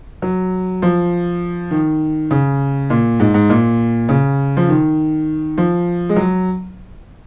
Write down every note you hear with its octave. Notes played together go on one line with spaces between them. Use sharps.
F#3
F3
D#3
C#3
A#2
G#2
G#2
A#2
C#3
F3
D#3
F3
G#3
F#3